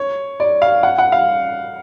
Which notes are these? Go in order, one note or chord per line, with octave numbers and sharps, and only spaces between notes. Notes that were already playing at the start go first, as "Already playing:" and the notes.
Already playing: C#5
D5
F5
F#5
F#5
F5